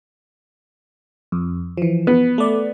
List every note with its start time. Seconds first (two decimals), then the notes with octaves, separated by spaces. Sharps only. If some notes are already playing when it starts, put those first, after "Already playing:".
1.32 F2
1.78 E3 F3
2.07 B3
2.38 A3 D5